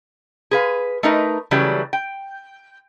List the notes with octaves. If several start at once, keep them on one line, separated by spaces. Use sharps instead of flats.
G#4 B4 F5
A3 D#4 A#4 B4
C#3 E3 F#3 G3 A3
G5